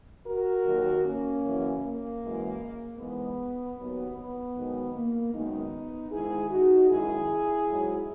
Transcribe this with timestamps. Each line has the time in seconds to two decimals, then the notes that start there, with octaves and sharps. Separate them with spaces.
0.25 F#4 A#4
0.65 D#2 D#3 F#3
1.03 A#3 C#4
1.42 F#2 C#3 E3
1.81 A#3
2.21 F#2 E3 G#3
2.98 G#2 E3 G#3 B3
3.77 D#2 D#3 F#3 B3
4.16 B3
4.55 G#2 D#3 F#3
4.94 A#3
5.33 F#2 D#3 G#3 B3 D#4
6.11 G#2 D#3 G#3 E4 G#4
6.50 D#4 F#4
6.89 F#2 D#3 G#3 E4 G#4
7.67 G#2 F#3